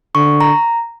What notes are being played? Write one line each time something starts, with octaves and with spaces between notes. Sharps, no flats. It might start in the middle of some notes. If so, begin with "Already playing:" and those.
D3 C#6
A#5